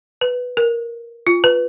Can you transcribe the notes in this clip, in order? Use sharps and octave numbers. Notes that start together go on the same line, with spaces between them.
B4
A#4
F4
B4